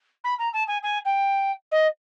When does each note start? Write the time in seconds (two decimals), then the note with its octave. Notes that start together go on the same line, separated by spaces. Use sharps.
0.24 B5
0.38 A#5
0.53 A5
0.67 G#5
0.82 G#5
1.05 G5
1.71 D#5